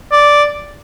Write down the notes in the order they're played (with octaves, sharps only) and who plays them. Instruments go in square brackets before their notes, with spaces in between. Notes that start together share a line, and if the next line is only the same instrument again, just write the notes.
[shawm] D5